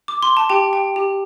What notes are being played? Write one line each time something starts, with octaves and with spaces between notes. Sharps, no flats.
D6
C6
A5
G4 G5
G5
G4